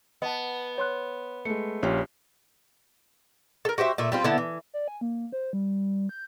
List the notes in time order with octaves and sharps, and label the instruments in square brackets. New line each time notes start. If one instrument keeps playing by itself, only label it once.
[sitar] B3 [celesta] D#5 F#5 A5
[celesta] C#5 C6 F#6
[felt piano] G#3 A3 [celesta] C#7
[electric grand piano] A#1 [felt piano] C#4 F4 G4
[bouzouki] A4 A#4
F#4 G4 C5 E5
A#2 A3 E5
G3 C4 F4
D3 B3 E4 A5
E3
[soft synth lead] D5
G#5
A#3
C5
G3
G6